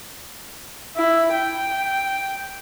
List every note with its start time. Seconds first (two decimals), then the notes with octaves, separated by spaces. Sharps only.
0.96 E4
1.32 G5